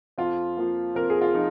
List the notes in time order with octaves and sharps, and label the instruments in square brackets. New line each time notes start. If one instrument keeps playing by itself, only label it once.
[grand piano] F2 F4
F3 A#3
F2 A#4
G#4
F4
F3 D#4